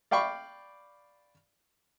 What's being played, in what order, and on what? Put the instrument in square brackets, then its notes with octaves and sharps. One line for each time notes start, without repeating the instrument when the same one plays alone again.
[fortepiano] D5 F5 G5 B5 C#6